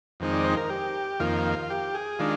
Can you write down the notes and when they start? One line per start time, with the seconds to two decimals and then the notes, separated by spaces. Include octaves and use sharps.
0.20 F2 D#3 G#3 C4 D#4
0.33 D5
0.44 C5
0.57 A#4
0.70 G4
1.20 F2 D#3 A#3 F4
1.70 G4
1.95 G#4
2.19 D#3 G#3 D4 F4